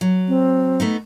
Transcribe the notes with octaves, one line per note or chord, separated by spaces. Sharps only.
F#3
C4
A3 B3 D#4